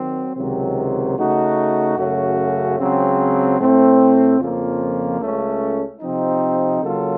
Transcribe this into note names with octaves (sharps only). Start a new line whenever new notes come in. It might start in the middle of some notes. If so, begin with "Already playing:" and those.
Already playing: D#3 F#3 C4
C#2 C3 D#3 F#3 C4
C#3 A3 D#4 F#4
F#2 C#3 A3 C#4 F#4
C#2 C#3 F#3 C4
A2 A3 C4
F2 C#3 F3 A#3 C#4
C#2 C#3 A3 C#4 A4
C3 F3 C4 D#4
C#3 F#3 A#3 F4 A4